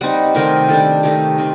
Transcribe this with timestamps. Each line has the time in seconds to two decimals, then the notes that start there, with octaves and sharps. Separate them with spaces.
0.01 G3 C4 D#4 F#5
0.35 C3 D#3 A3 C4 A#4
0.69 D#3 G3 D4 A4
1.03 C3 D#3 A3 D#4 G4
1.38 D#3 A3 C4